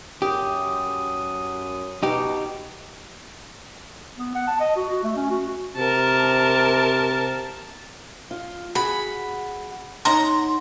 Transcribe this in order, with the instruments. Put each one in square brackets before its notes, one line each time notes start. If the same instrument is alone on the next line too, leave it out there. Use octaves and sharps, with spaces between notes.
[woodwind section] F#2 D#6 [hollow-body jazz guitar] G4
[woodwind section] B2 [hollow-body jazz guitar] D#4 G4
[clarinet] B3
F#5
A5
D#5
F#4
F#4
A3
C#4
F#4
[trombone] C3 [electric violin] A#4 A5
[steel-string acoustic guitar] F4
[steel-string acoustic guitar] F#4 G#4 F#5 [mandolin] B5
[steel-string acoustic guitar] D#4 C#5 F#5 [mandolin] A#5 [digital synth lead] C6